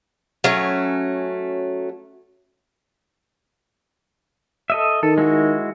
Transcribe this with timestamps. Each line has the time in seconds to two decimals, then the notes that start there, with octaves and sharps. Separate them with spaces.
0.44 F#3 A3 C#4
4.70 A4 D#5 E5
5.03 D#3 A4
5.18 G#3 E4 F#4